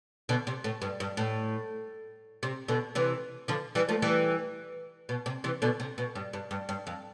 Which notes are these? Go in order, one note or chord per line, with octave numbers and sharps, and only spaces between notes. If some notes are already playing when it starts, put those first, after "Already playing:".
B2 D3
C3
A2
G2
G2
A2
C3
B2 D3
C3 E3
D3 F3
E3 G3
F3 A3
E3 G3
B2
C3
C3 E3
B2 D3
C3
B2
G2
G2
G2
G2
F2